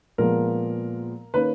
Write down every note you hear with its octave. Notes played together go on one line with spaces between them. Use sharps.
A#2 F3 G#3 B3 A#4
D#3 A#3 C#4 B4